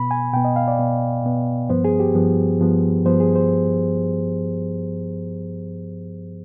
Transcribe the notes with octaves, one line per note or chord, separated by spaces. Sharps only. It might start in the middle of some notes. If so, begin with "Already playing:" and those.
Already playing: B2 B3 B5
G#5
B2 B3 G5
D#5
F5
D5
B2 B3
B2 B3
G2 F3 B3 C5
G#4
G4
G2 F3 B3
G2 F3 B3
G2 F3 B3 C5
G#4
C5